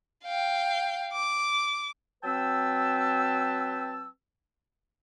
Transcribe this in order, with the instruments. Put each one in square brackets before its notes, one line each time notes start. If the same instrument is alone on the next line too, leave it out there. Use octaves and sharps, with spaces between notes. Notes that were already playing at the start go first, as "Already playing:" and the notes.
[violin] F5 G5
D6
[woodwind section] F#3 C4 B4 G5 A5 E6